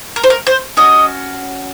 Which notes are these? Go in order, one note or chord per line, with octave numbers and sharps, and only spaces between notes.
A#4
C5
A#4
C5
C#4 F#4 D#5